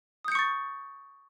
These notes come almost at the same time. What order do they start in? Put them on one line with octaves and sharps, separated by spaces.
D#6 G6 C#7 C#6 A6